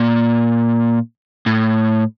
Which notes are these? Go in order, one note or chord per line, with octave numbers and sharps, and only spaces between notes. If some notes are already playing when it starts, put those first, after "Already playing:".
Already playing: A#2
A2